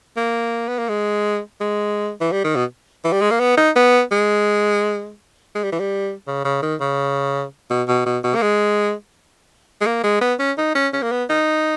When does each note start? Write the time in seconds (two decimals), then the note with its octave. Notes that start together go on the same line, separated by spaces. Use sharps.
0.17 A#3
0.68 B3
0.78 A#3
0.88 G#3
1.60 G#3
2.21 E3
2.32 G3
2.44 D#3
2.56 B2
3.04 E3
3.12 G3
3.21 G#3
3.31 A#3
3.40 B3
3.57 D#4
3.76 B3
4.11 G#3
5.55 G#3
5.63 G3
5.72 E3
5.80 G3
6.27 C#3
6.45 C#3
6.62 D#3
6.80 C#3
7.70 B2
7.88 B2
8.06 B2
8.24 B2
8.35 A#3
8.42 G#3
9.81 G#3
9.86 A#3
10.03 G#3
10.21 B3
10.39 C#4
10.58 D#4
10.75 C#4
10.93 C#4
11.02 A#3
11.11 B3
11.29 D#4